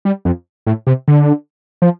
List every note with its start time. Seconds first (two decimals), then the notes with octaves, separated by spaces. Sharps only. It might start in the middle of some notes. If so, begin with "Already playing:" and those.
0.05 G3
0.25 F2
0.67 A2
0.87 C3
1.08 D3
1.82 F3